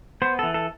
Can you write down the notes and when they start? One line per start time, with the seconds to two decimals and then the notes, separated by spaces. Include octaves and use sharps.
0.22 B3 C5
0.39 E3 A4
0.54 A4